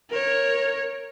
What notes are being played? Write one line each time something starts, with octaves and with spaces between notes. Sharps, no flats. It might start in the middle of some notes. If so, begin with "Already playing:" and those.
A#4 C#5